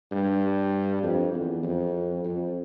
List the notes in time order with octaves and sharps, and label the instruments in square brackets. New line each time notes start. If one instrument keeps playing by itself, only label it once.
[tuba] G2
F2
E2
F2
F2